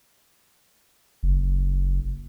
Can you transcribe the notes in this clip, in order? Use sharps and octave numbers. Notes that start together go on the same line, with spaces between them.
F#1